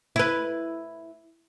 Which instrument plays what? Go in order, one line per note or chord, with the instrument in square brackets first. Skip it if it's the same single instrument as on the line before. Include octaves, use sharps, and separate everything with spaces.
[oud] E4 B4